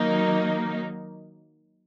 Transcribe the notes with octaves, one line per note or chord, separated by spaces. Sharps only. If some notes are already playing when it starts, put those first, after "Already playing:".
Already playing: D#3 F#3 A#3 D#4